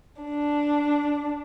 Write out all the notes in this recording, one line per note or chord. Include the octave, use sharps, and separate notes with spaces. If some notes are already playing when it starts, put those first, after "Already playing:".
D4